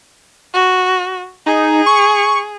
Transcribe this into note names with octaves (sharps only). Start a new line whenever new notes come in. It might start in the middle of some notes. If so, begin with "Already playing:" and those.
F#4
D#4 G#4
C#6